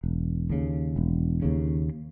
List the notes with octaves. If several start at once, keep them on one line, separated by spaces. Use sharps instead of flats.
E1
D#2 C#3
E1
D#2 C#3